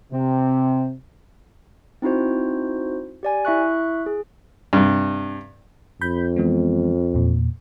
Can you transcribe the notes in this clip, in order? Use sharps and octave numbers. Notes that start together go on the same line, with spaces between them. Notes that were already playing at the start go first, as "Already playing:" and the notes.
C3 C4
C4 D#4 E4 F#4 C5
G4 D5 G#5
E4 E5 C#6 F#6
G#4
G2 C3
F2 B5 G6
E3 G#3 B3
E2 A#2